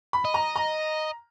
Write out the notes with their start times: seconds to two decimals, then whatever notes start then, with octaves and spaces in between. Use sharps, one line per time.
0.13 B5
0.25 D#5
0.34 A#5
0.56 A#5